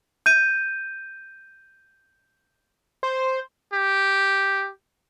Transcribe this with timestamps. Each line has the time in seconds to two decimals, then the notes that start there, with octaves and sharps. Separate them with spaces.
0.26 G6 D#7
3.03 C5
3.73 G4